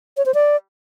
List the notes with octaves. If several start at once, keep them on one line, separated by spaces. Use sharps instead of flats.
C#5
C5
D5